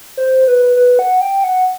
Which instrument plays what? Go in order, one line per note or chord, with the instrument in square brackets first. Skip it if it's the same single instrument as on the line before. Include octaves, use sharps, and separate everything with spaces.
[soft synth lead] C5
B4
B4
F#5
G5
F#5